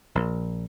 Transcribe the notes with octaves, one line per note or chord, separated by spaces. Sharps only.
A#1